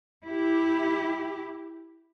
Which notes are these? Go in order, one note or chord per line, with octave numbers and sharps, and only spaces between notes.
E4 G4